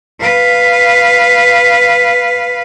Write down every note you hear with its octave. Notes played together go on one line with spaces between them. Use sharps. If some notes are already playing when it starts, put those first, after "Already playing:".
B4 F5